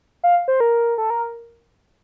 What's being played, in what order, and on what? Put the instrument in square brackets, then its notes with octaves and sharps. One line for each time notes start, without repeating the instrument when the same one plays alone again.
[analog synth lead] F5
C5
A#4
A4
A#4